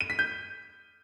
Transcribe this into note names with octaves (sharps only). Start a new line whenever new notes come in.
D#7
B6
G6